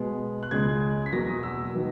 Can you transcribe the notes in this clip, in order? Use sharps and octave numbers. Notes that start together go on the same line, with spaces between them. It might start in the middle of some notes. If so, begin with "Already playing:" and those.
Already playing: B2 G#3 B3
F#6
C#2 C#3 G#3 G#6
B6
E2 B2 F#3 A#3 A#6
D#6
E6
D#3 F#3 B3